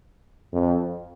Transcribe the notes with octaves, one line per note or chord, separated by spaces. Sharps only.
F2